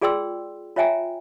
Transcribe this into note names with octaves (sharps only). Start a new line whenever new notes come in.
F4 G#4 D5 G5 C6 E6
F4 C#5 E5 G5 G#5 A#5